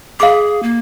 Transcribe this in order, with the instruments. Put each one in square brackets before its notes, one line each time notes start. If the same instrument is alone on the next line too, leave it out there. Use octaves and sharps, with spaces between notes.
[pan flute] G#4 [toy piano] F5 D6
[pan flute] A#3